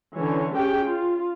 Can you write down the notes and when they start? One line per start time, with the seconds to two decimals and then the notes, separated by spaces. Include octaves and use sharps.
0.18 D3 E3 C#4 C#5
0.54 C#4 G4 G#4 G5
0.87 F4